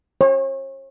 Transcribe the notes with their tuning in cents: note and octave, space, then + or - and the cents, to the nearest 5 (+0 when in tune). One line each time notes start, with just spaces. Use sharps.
C#5 -45